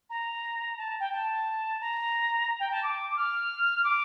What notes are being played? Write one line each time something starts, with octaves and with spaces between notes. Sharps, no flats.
A#5
A5
G5
A5
A#5
G5
A5
D6
F6
D6